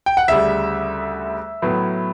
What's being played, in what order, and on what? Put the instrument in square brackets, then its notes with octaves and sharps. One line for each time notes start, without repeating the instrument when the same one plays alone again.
[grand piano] G5
F#5
D2 C#3 G3 E5
A2 F#3 B3